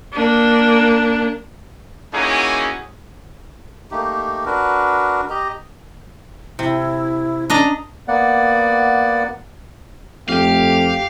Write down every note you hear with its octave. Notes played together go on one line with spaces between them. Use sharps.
A#3 D4
A#3 C#4 D#4 E4 F#4 G#4
A3 A#3 D#4 G4
D4 F#4 A#4 B4
G4 D#5 A#5
C3 E4
C#4 D4 D#5 A#5
A#3 B3 D5 F#5
F2 A3 G4 F5